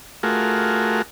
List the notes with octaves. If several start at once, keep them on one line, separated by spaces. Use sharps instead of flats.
A3 F4 F#4 G#4 A#4